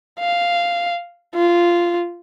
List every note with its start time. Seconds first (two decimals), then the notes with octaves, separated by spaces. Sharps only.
0.19 F5
1.35 F4